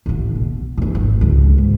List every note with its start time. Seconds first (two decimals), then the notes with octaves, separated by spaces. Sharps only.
0.06 A1 D3
0.35 B2
0.78 E2 A2
0.95 G#1
1.21 C#2 D3
1.58 G#2